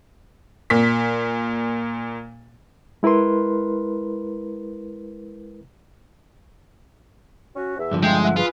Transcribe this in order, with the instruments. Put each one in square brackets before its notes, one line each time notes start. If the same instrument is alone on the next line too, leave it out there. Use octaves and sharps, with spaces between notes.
[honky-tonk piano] A#2 B6
[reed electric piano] G#3 E4 A#4 B4 C6
[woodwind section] C#4 F#4
E2 E5
[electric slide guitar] G2 D3 F3
[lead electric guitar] G#3 [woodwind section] F4 E5 G5
[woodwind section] E5 F#5
[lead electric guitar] F4 [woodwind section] G#4 B4